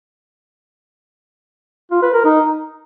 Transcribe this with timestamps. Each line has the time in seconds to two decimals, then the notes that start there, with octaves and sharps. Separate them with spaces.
1.91 F4
2.03 B4
2.14 A#4
2.25 D#4